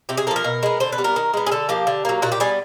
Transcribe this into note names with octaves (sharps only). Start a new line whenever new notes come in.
C3 G4
G#4
F3 A#3 A4
A#4
B2
G#3 B3
D3 C5
B4
G3 B3
A#4
D#3
G#3 B3
G#4
D3 A4
F3 A#3 G4
D3
F#3 A#3
A#2 F#4
G4
G3 B3 G#4